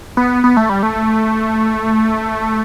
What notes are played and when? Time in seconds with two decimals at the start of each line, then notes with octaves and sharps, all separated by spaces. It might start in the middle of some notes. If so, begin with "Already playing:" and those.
0.17 B3
0.44 B3
0.57 A3
0.69 G3
0.83 A3